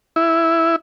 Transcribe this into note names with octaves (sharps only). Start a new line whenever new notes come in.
E4